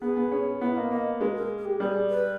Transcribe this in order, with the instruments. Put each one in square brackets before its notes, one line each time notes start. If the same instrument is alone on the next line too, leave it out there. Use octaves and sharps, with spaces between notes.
[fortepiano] B3 [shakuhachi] G#4
[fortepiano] B3
C#4
[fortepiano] B3 [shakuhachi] E4
[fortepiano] A#3 [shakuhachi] D#5
[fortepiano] A#3 [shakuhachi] D#5
[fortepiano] G#3 [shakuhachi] B4
[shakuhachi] A#4
G#4
G4
[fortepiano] G3 [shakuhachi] G#4
[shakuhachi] B4